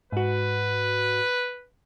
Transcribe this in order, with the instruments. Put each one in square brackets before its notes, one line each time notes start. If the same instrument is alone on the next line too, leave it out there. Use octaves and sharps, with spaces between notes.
[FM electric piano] G#2 F#4 [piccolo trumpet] B4